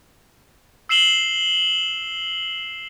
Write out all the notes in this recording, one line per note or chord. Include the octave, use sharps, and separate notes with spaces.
E6 C7 E7 F#7 G7